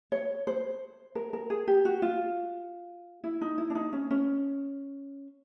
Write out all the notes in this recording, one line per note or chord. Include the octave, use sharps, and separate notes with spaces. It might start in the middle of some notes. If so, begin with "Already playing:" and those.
C#5
C5
A#4
A#4
G#4
G4
F#4
F4
E4
D#4
E4
D4
D#4
C#4
C#4